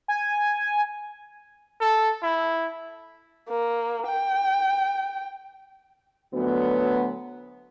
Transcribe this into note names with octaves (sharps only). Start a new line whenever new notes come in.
G#5
A4
E4
A#3
G5
D2 F#3 B3